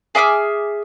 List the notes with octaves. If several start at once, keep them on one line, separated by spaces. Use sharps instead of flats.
G#4 E5 D6 F6